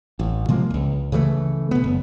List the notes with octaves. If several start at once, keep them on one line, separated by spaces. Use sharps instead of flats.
A1
C3 F3 G#3 A#3
E1 C#2
C#3 E3 F#3 A3
B2 B3
F#1